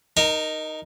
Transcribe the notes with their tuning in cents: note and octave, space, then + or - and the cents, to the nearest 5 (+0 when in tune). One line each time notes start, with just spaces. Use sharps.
D#4 +0 A#4 +5 A#5 -40